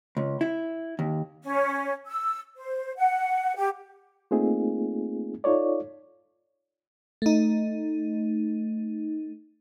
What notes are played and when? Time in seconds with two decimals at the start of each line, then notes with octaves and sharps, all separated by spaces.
0.17 C#2
0.41 E4
0.99 D#2
1.43 C#4
2.07 E6
2.57 C5
2.97 F#5
3.56 G4
4.31 A3 A#3 C4 D#4 F4 G#4
5.44 D#4 F4 A4 C#5 D5
7.22 A3 D#4